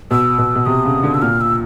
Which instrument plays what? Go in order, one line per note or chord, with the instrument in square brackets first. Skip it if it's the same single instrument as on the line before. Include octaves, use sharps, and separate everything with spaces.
[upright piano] B2 [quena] E6
[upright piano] B2
B2
[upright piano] C3 [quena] D#6
[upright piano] C#3
D3
[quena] E6
[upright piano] A#2 [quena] F6
[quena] E6